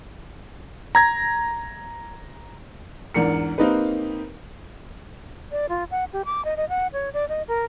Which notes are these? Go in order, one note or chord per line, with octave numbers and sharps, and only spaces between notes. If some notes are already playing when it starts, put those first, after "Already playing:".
A#5 G#6 A#6
E2 G#2 D4 A#4 C#7
A#3 C4 D#4 G4 B4
D5
F4
F#5
G4
D6
D#5
D#5
F#5
C#5
D5
D#5
A#4